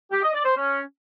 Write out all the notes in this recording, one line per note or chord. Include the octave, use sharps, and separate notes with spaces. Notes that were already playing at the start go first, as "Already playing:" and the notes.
G4
D#5
D5
C5
C#4